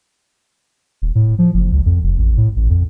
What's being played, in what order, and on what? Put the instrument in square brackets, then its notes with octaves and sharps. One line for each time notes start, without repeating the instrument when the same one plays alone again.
[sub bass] D#1
A2
F3
F#1
C#2
F2
F1
A1
A2
A1
F2